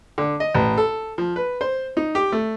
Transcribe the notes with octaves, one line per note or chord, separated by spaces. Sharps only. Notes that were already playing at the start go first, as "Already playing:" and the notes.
D3
D#5
A1
A4
F3
B4
C5
D#4
G4
A3